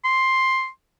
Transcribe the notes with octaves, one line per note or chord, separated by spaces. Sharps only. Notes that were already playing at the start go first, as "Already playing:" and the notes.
C6